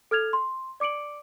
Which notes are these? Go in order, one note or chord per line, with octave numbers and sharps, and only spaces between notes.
A4 F6 G#6 F7
C6
D5 D6 C#7 D7 F#7